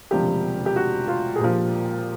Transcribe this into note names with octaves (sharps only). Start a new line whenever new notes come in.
E1 D2 C3 F3 G4
G4
F#4
F4
G#4
A#1 A#2 F3 G4